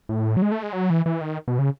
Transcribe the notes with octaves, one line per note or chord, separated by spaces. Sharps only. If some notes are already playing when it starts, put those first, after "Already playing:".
A2
F#3
G#3
A3
G#3
F#3
E3
E3
D#3
B2
C#3